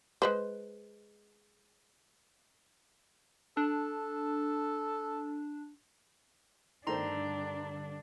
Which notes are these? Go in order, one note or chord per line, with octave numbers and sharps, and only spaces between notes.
G#3 B4 C5
D4 A4
G2 D3 D#3 A3 D4 C5 A#5 C6